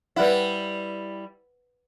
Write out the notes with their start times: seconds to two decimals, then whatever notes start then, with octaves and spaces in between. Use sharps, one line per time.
0.16 G3 E4 B4 C5 F#5